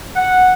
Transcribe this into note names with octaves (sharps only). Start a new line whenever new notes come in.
F#5